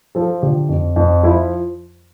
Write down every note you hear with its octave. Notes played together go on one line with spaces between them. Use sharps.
F3 A4
D3 G4
F2
F2
F3 E4